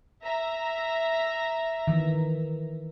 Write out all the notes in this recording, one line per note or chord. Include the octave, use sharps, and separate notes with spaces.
E5 A#5
D#3 E3